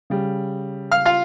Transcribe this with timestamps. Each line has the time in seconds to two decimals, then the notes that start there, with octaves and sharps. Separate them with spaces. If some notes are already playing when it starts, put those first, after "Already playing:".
0.10 C#3 G3
0.91 F5 F6
1.06 F4 F5